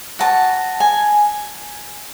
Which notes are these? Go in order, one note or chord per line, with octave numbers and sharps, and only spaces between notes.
F#4 A5
G#5